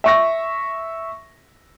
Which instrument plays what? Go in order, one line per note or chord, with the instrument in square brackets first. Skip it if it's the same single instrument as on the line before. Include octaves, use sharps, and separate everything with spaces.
[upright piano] E5 C#6 A#6